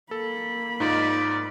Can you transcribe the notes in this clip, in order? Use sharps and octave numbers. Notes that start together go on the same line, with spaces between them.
A#3 A4 B5
G#2 D#4 F4 D5